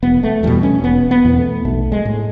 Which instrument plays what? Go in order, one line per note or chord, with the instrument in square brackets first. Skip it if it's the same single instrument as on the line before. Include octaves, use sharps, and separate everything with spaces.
[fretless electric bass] E1 B3
A3
E2 B2 G3
C#4
E1 B3
B3
E2 B2
A3
B1 A3
G#3
A2